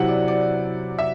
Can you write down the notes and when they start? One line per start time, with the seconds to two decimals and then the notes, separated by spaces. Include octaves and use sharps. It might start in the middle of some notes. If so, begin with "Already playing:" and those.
Already playing: C3 F#3 C4 E4 F#5
0.08 D5
0.28 D5
0.99 E5